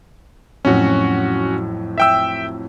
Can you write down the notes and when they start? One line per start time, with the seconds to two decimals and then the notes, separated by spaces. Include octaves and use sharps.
0.65 F2 A2 F#3 C#4 F#4
1.98 E5 G5 E6